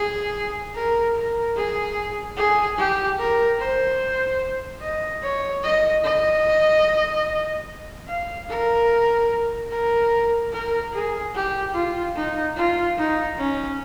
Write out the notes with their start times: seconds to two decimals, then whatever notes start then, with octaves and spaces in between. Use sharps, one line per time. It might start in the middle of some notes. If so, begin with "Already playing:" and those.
Already playing: G#4
0.75 A#4
1.15 A#4
1.56 G#4
2.37 G#4
2.77 G4
3.18 A#4
3.59 C5
4.81 D#5
5.22 C#5
5.63 D#5
6.04 D#5
8.07 F5
8.49 A#4
9.71 A#4
10.52 A#4
10.93 G#4
11.34 G4
11.74 F4
12.16 D#4
12.56 F4
12.97 D#4
13.38 C#4